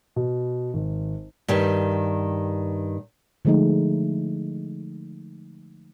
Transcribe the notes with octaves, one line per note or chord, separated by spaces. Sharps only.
B2
G#1
G2 D#3 G4
D3 F3 G#3 A3 D#4